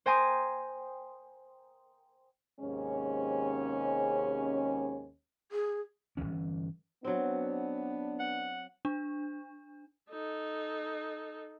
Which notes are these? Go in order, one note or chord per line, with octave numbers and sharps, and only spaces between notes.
C5 G5 G#5 A#5 C6 D#6
D#2 G#2 C3 G#3 C#4
G#4
G1 D#2 E3 C#4
F#3 B3 C4 D4
F#5
D4
D#4 A4